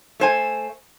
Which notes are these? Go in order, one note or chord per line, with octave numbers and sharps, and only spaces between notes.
A3 C5 G#5